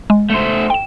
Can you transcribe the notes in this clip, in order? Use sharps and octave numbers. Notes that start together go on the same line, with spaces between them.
G#3
A3 C5
G5 E7